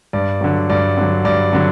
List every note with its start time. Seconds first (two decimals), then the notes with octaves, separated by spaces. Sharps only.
0.13 G2 D5
0.41 D3 F#3
0.70 G2 D5
0.97 D3 F#3
1.25 G2 D5
1.53 D3 F#3